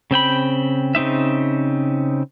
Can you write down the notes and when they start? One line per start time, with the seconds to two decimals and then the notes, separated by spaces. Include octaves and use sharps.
0.11 C#3 C4 G5 B5
0.95 C#3 C4 D#4 E5